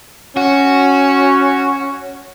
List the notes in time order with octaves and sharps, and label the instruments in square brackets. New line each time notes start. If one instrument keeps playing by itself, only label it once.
[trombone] C#4 [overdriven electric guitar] F#4